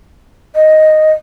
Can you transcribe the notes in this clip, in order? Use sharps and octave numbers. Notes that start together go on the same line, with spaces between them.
D#5